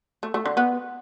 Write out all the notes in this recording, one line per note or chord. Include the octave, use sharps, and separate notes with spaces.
A3
A3
D3
B3